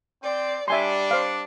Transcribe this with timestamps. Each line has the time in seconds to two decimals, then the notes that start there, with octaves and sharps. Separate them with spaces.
0.23 C4 D5 G5 C6
0.68 G3 D4 E5 G#5 C6
1.11 C5 F5